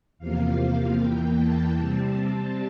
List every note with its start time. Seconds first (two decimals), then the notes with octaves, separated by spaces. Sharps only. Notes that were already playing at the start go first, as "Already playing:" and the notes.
0.19 E2 C3 F3 A#3 F5
0.98 E2 E3 A#3 G5
1.37 A5
1.77 C3 G3 C4 A5